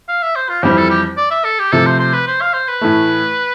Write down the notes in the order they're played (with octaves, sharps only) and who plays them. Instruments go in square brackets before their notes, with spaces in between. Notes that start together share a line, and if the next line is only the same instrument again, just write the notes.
[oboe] F5
E5
C5
F4
[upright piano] F2 E3 G3 C4 [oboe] G4
[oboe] A4
G4
D5
E5
A4
G4
[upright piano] C3 F3 A3 [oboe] A4
[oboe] C5
C5
B4
C5
F5
C5
B4
[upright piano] A2 E3 A3